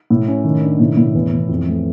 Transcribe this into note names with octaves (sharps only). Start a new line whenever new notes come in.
A2
C#4
D#3
D4
A2
A2
E2
E2
F2
A3